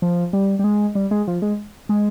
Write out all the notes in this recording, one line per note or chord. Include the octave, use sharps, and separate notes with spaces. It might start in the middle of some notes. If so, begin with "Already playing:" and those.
F3
G3
G3
G#3
G3
G#3
F3
G#3
G#3